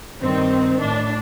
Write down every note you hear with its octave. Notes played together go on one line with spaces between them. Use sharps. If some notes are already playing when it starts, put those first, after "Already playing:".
G2 D#3 C4
A2 D4